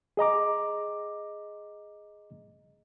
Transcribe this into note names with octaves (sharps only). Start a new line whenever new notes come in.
G#4 D#5 A#5 D6